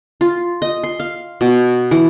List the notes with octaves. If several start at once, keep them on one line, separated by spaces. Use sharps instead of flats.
F4
D#5
C6
F5
B2
E3